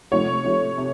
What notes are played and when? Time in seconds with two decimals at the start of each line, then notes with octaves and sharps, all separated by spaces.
0.11 C3 F3 A3 C#5
0.44 C3 F3 A3
0.78 C3